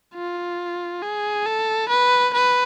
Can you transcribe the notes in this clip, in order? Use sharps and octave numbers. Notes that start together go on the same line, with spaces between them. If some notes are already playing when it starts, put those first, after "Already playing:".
F4
G#4
A4
B4
B4